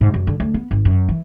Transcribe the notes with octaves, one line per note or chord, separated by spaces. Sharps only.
G#2
F#2
D3
D2
B3
G#1
F#2
E3